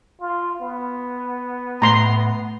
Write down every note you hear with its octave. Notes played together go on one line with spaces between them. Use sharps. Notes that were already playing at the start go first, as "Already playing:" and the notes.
F4
B3
A2 A#5 C6